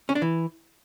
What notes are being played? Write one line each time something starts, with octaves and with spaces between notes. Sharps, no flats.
C#4
D4
E3